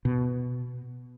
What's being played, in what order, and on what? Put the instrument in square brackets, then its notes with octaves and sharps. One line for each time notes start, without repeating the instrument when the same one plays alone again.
[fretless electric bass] B2